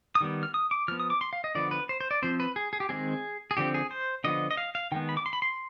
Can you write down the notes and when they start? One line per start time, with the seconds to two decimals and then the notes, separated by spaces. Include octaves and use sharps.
0.15 D#6
0.21 D#3 G3 B3
0.43 F6
0.54 D#6
0.71 D6
0.88 F3 F6
0.91 B3
1.00 D#6
1.10 D6
1.21 C6
1.33 F5
1.44 D#5
1.55 D3 F3 B3 D5
1.71 B4
1.89 C5
2.01 C5
2.11 D5
2.22 F3 C4 C5
2.40 B4
2.56 G#4
2.73 G#4
2.80 G4
2.89 D#3 G#3 C4 G#4
3.51 G#4
3.57 D3 F3 C4 G4
3.74 G#4
3.91 C5
4.24 D3 F3 B3 D#5
4.51 D#5
4.57 F5
4.75 F5
4.92 D#3 G#3 B3 G5
5.09 B5
5.17 D6
5.26 C6
5.33 B5
5.42 C6